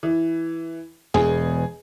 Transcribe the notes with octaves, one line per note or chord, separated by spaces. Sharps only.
E3
E1 E2 G#4